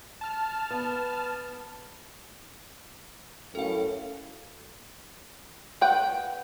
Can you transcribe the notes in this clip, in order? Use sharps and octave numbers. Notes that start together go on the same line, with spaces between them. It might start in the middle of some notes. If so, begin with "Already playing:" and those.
A5 F6
B3
F#2 A2 A4 F5
B4 F#5 G5